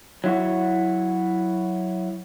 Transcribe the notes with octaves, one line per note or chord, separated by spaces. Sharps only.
F#3 E4 F#4